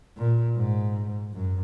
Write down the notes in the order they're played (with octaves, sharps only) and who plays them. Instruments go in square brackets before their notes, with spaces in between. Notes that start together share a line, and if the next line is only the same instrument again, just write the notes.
[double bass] A#2
G#2
F#2